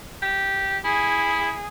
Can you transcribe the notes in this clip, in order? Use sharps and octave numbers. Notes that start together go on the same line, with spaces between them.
G4
E4 G#4